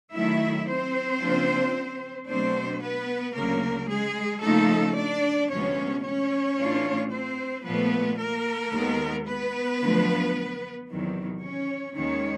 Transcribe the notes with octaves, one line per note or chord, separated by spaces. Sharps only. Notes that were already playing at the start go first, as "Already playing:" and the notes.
D#3 F#3 A3 E4 E5
C4 C5
C#3 F3 A#3 D4 F4
B2 F#3 A3 C4 D4 C5
B3 B4
D2 C#3 F#3 A#3 A#4
G#3 G#4
C#3 F3 A3 A#3 D#4 A4
D4 D5
D2 C3 F3 G#3 B3 C#4 C#5
C#4 C#5
A2 E3 A3 D4 F4
C4 C5
A#2 F3 A3 B3 B4
A#3 A#4
D#2 D#3 G#3 B3
B3 B4
F#2 D3 F3 A3
E2 C3 D#3 F#3
C#4 C#5
D#2 D#3 G#3 C#4 C#5